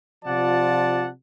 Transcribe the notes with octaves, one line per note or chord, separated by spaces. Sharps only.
C3 F3 F4 D5 F#5 A5